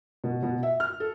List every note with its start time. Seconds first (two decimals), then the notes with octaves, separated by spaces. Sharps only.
0.24 B2
0.43 B2
0.63 E5
0.80 F6
1.00 A4